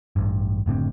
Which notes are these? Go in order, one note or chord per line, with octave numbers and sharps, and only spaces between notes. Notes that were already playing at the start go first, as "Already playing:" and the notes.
A1 G2
F#1 A2 D3 C4